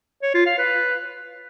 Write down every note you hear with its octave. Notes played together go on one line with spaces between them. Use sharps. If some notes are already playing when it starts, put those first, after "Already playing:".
C#5
F4
F5
B4